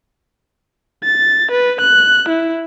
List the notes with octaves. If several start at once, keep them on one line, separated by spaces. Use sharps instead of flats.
A6
B4
F#6
E4